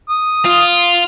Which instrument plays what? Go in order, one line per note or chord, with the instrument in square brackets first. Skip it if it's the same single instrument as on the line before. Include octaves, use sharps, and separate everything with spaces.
[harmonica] D#6
[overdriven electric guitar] F4